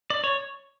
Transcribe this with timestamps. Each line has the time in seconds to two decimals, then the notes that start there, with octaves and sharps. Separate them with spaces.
0.10 D5
0.24 C#5